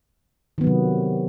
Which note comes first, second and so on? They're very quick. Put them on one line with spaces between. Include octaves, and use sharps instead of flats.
D#3 B3 F#3 C3